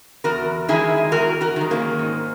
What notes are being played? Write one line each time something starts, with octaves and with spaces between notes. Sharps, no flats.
E2 F#4 A#4
D#3 G#3 E4 G#4
E2 F#4 A#4
F#4 A#4
D#3 G#3
A#3 C#4
G#2